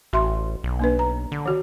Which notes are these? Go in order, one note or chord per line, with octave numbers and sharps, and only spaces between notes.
A1 F#4 E5 C6
B1
A#3 D4 B4
A#5
D3
D#3 F#4